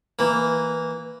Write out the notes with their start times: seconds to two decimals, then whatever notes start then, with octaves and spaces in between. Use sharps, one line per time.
0.19 E3 A#3